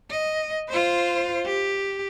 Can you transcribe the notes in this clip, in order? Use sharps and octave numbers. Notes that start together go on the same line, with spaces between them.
D#5
F4 C5
G4